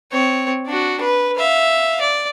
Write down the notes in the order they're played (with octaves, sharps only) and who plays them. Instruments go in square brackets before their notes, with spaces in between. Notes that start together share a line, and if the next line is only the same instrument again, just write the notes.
[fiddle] C4 C#5
D4 F#4
B4
E5 F5
D5